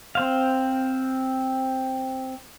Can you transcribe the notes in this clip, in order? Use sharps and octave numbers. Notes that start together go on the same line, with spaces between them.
C4 C5 F5